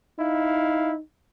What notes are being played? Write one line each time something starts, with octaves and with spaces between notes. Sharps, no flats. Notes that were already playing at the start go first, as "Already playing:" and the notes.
D#4 E4 F5